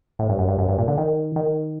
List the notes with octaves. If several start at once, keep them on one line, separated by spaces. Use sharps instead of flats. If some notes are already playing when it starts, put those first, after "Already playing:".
A2
G2
F#2
G2
F#2
G2
A#2
D3
D#3
D#3